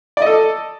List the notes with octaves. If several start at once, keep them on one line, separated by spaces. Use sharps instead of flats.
A4 D5 D#5